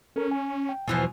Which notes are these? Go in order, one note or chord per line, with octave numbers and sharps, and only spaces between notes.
C#4 A4 A#4
G#5
G5
E2 B2 E3 F3 G#5